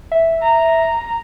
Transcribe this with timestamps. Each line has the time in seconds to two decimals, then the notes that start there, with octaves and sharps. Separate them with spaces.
0.12 E5
0.42 A#5